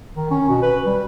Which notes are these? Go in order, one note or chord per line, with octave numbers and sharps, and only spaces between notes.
D#3
C#4
B2
B4
G3